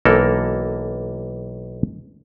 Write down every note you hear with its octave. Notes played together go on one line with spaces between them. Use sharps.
B1 E3 A#3 A4 A#4